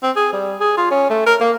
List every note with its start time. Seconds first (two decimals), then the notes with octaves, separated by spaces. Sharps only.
0.03 C4
0.16 G#4
0.33 G3
0.60 G#4
0.77 F4
0.91 C#4
1.10 A3
1.26 A#4
1.41 A#3